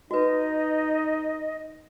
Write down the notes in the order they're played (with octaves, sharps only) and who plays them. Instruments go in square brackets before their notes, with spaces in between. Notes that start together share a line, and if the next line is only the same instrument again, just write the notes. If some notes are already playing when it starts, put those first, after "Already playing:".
[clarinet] D#4 [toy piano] F#4 B4 [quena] D#5